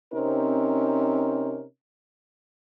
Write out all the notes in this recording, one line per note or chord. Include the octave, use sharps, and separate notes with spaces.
C3 C4 C#4 D#4 A#4